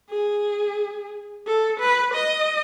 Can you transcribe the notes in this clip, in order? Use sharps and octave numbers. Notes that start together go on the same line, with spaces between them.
G#4
A4
B4
D#5